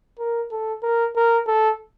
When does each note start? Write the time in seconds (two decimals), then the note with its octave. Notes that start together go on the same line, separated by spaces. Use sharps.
0.19 A#4
0.51 A4
0.83 A#4
1.16 A#4
1.47 A4